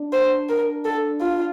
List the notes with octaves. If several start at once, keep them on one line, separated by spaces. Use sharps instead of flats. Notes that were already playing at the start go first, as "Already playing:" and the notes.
Already playing: D4
C5
A#4
A4
F4